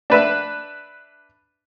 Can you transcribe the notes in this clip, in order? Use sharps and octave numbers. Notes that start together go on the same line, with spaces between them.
D4 B4 E5